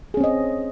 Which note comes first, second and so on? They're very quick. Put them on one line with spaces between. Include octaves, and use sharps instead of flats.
G#4 C#4 C4 D#5